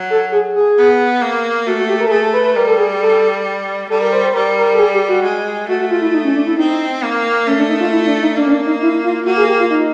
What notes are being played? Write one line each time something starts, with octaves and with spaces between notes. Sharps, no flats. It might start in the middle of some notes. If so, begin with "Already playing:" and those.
Already playing: F#3
A4
G#4
G#4
B3
A#3
A3 F#4
F#4
G4
A#4
A4
A3 G#4
A4
B4
B4
G3 A#4
A4
G#4
A4
G3 A4
A#4
C5
C5
G3 A#4
A#4
A4
G#4
G4
F#4
G#3
A3 F#4
F#4
F4
E4
D#4
C#4
D4
E4
C4 D#4
A#3
A3 C#4
D4
D#4
F4
E4
D4
D#4
A#3 D4
C#4
D4
D#4
E4
F4
A#3 F#4
G#4
G4
F4
D#4